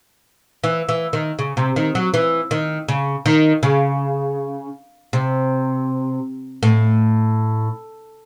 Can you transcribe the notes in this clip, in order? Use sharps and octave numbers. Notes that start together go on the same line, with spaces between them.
E3
E3
D#3
C#3
C3
D#3
F#3
E3
D#3
C#3
D#3
C#3
C3
A2